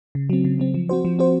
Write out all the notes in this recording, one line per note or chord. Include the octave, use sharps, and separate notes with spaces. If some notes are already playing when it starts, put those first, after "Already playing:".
C#3
F#3 C4
C#3
F#3 C4
F3
C4 F#4 C5
F3
C4 F#4 C5